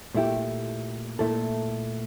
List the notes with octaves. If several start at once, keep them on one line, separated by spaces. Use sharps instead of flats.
A#2 A3 E4 G4
A#2 A3 E4 A4